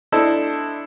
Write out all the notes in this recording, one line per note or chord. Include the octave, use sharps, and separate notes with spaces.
D4 E4 A4 C5 D#5